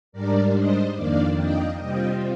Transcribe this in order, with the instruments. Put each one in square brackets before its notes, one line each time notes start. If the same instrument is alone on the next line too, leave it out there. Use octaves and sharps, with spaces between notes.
[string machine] G#2 G3 D4 A#4 D5
C5 D#5
F2 D#3 A#3 D4 D5 F5
D#5 G5
C3 G3 C4 F4 D#5 G5